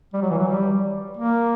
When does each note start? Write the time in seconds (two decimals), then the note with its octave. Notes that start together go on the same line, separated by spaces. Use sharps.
0.14 G3
0.22 F#3
0.30 E3
0.39 F#3
0.48 G3
1.17 A#3